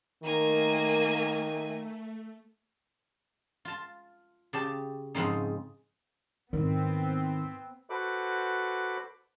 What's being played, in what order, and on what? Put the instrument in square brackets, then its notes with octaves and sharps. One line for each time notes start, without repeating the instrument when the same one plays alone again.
[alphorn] D#3 [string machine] A3 [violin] A#3 G#5
[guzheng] F4 A5
C#3 G4 A5
G#2 C#3 F3 C4 D#4
[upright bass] G#2 E4 [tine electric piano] D#3 [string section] B3 C4
[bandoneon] F#4 A4 B4 C5 B5 D6